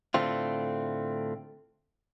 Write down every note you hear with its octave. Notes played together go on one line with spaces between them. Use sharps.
A2 D3 A3 C4 F4